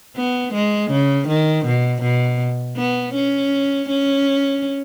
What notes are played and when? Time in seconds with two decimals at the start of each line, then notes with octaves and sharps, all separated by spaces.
0.16 B3
0.54 G#3
0.91 C#3
1.28 D#3
1.66 B2
2.02 B2
2.77 B3
3.14 C#4
3.89 C#4